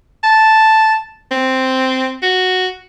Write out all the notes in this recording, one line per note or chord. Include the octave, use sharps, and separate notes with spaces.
A5
C4
F#4